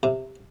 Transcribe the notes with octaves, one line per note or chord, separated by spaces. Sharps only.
C3